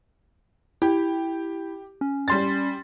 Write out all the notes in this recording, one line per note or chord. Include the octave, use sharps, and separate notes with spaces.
E4 G4
C#4
G3 C6 A6